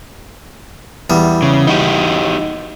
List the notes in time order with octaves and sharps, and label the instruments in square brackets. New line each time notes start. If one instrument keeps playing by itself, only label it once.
[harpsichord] E2 G3
[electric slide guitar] C#3
D#4 F#4 G4